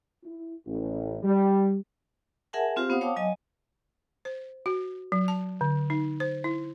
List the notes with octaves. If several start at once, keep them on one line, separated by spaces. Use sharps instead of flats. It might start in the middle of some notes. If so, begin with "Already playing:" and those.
E4
A1
G3
G#4 A#4 E5 F#5 G#5 A5
C4 F4 G4 C5 F5
B3 C5 F5 F#5 D#6
C#5 F5 G5 A5 D6 D#6
F#3 D#5 G#5
C5
F#4
F#3
A5
D3
D#4
C5
E4